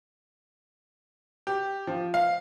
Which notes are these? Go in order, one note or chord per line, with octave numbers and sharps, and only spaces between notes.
G4
F3
F5